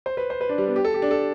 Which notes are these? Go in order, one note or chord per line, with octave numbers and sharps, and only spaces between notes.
C5
B4
C5
B4
D4
G3
B3
G4
A4
G4
D4
A4